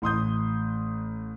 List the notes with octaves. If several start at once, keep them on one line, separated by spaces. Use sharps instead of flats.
A1 C6 D#6 G6